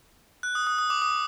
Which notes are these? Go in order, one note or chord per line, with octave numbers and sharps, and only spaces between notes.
F#6
D#6
D#6
D#6
D6
D#6